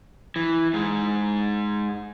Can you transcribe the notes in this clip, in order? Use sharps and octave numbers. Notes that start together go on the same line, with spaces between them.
E3
G#2 G#3